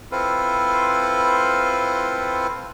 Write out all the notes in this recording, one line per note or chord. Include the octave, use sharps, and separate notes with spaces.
C4 E4 F4 A4 B4 C5